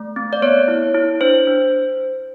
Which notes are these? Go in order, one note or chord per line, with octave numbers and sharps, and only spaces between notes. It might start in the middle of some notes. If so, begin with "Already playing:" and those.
Already playing: A3
C4
D5
B3 C#5
E4
E4
D4 C5
D4